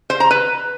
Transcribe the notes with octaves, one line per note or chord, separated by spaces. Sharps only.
C5
A#5
B4